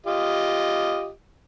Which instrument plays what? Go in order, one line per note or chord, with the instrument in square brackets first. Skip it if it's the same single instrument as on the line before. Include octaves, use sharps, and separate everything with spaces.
[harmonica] F4 G4 D#5